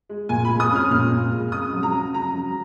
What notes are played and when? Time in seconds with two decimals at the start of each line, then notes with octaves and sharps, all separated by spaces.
0.09 G#3
0.29 A#2 G#5
0.45 G#3 B5
0.60 D#6
0.71 C#4 F6
0.91 A#2 F6
1.12 A#2
1.32 G#3
1.52 C#3 D#6
1.73 F#3
1.83 A#5
1.93 C#3
2.13 C#3 A#5
2.34 F#3